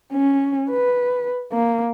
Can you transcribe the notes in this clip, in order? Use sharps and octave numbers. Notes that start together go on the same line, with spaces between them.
C#4
B4
A#3